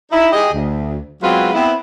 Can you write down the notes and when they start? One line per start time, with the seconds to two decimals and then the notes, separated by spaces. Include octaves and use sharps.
0.10 D#4 E4
0.31 G4 G#4 D#5
0.52 D2
1.22 F#3 G#3 B3 C4 F4 B4
1.54 B3 C4 E4